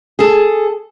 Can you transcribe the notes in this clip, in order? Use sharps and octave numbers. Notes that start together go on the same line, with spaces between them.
G#4 A4